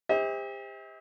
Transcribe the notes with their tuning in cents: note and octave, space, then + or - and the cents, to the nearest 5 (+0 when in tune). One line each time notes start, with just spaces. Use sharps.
G4 +40 C5 +0 E5 -45